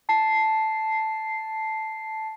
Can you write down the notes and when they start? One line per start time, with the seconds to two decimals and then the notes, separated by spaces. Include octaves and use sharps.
0.09 A5 C7